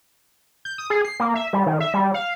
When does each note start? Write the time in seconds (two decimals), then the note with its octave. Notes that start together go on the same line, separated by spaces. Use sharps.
0.65 G6
0.78 D#6
0.90 G#4
1.05 C7
1.20 A#3
1.35 E5
1.53 G3
1.66 D#3
1.80 E5
1.94 G3
2.14 F5